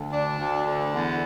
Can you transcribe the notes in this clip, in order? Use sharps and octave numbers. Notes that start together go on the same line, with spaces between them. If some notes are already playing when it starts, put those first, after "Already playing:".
Already playing: D2
D4
D2
D3
E2